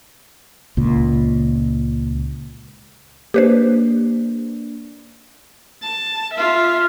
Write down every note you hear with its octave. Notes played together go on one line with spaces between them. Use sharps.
C#2 A#2
A#3 D4 G4 B4 C5
A5
F4 E5